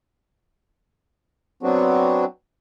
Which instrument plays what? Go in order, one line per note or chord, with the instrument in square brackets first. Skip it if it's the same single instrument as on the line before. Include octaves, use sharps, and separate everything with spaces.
[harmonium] F#3 B3 C4 D4 F#4